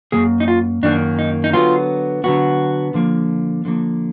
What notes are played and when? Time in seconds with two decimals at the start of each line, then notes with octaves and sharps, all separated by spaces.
0.12 F#2 D#3 A#3 G#4
0.40 D#4
0.48 F4
0.83 F#2 D#3 A#3 D4
1.19 D#4
1.44 D#4
1.53 D3 F#3 B3 F4
2.24 D3 F#3 B3 F#4
2.94 D3 F3 A#3
3.65 D3 F3 A#3